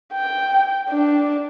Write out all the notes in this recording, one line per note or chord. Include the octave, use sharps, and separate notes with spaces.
G5
D4